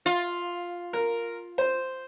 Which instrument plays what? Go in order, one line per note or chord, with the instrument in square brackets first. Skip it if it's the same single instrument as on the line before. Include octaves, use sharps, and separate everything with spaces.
[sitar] F4
[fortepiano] A#4
C5